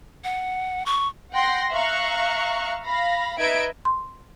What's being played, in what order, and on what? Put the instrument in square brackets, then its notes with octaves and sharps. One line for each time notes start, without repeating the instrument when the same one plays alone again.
[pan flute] F#5
C#6
[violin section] F#5 G5 C6 A#6
E5 F5 A#5 C#6 F#6
F5 B5 A#6
D#4 B4 D#5 E5 G#6 D7
[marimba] C6